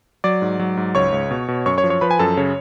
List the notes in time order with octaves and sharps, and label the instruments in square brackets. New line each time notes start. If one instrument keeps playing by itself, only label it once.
[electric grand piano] F#3 D5 D6
G#2
F#3
G#2
C#2 C#5 C#6
C#2
B2
B2
F#2 C#5 C#6
C#5 C#6
F3
C#5 C#6
F3 B4 B5
G#5
F#2 A4 A5
C#3 C#5